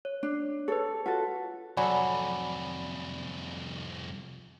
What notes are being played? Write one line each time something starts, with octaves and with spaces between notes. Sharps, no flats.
C#5
D4
G#4 A4 B4 C#5
F4 F#4 A4 F#5
C2 F2 F#3 A4 D5 G#5 B5